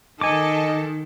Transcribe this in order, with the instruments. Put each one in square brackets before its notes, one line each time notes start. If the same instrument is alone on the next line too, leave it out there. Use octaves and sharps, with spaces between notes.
[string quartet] D#3 [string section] A4 [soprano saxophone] D#5 [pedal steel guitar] G#5 D6